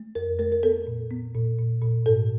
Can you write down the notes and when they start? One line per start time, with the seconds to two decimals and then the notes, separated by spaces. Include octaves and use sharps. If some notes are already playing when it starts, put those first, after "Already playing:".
Already playing: A3
0.15 F2 A#4
0.39 A3 A#4
0.52 A#4
0.63 B3 A4
0.87 A#2
1.11 B3
1.35 A#2
1.59 A#2
1.82 A#2
2.06 G#2 A4